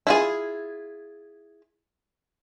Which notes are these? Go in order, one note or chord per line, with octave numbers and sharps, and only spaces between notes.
E4 F4 G#4